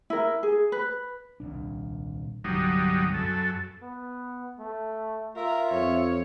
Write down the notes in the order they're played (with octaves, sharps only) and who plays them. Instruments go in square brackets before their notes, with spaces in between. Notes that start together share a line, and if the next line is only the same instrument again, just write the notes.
[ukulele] E4 A#4
G#4
B4
[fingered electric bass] D#1 C2 D4
[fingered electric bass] G1 C2 [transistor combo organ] F#3 G3 D#4
[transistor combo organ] F#2 A4
[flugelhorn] B3
A3
[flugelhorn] F4 [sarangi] A#4 [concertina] E5
[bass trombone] F2 [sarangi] C#5